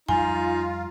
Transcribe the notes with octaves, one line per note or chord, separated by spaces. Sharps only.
F2 G3 D#4 F4 G#5